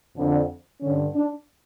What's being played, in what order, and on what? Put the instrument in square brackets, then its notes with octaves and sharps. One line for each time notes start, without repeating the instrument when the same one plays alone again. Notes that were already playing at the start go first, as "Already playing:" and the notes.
[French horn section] F2 D3
G2 D3 C#4
D4